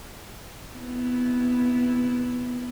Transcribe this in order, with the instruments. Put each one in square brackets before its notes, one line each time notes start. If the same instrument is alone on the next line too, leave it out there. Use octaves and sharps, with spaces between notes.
[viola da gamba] C3 B3 E4